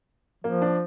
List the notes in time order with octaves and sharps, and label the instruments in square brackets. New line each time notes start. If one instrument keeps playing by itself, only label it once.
[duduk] F3 [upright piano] A#3
[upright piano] D4